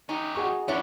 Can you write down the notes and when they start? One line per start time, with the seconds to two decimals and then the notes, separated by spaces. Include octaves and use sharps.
0.09 C#4 D#4 G4
0.35 F#4 G#4 C#6
0.68 F3 B3 C#4 D4 E4 C#5 E5